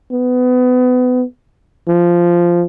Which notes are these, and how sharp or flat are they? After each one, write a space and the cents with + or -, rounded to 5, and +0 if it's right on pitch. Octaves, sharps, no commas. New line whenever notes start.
B3 +25
F3 -10